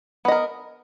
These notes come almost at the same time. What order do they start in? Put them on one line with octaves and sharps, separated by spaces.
B3 D#5 A#4